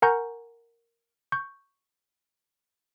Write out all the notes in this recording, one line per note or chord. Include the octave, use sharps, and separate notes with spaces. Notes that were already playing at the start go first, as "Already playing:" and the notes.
A#4 F#5 G#5 A#5 C#6 G6
C#6 G6